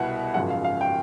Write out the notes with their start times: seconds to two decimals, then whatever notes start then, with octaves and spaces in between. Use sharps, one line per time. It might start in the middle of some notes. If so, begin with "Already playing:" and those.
Already playing: C2 B2 B3 E4 F#5
0.34 G#1 F#2 C#3 F3 F#5
0.50 F5
0.64 F5
0.81 G5